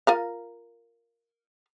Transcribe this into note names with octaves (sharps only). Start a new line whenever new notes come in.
F4 A#4 F5